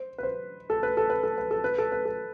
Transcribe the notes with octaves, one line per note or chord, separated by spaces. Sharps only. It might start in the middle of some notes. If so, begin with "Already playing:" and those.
Already playing: C5
B4
C5
A4
B4
A4
B4
A4
B4
A4
B4
A4
B4
A4